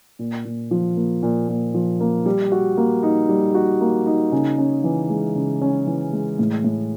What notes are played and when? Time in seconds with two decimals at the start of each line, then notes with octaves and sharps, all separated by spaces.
0.19 A#2
0.45 A#2
0.71 F3
0.97 A#3
1.23 A#2
1.48 A#2
1.74 F3
2.00 A#3
2.26 G3
2.52 F#4
2.77 A#3
3.03 D#4
3.29 G3
3.55 F#4
3.81 A#3
4.06 D#4
4.32 C#3
4.58 C#4
4.84 E3
5.10 G#3
5.35 C#3
5.62 C#4
5.87 E3
6.13 G#3
6.39 A2
6.64 A2